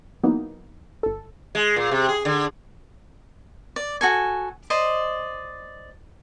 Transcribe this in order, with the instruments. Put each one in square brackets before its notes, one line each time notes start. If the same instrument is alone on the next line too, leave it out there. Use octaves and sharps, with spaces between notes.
[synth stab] E3 F#3 A#3 B3 D#4
G1 A4
[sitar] G#3
A#2
C3
G#4
D3
[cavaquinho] D5
F#4 A4 G#5
C5 D5 D#5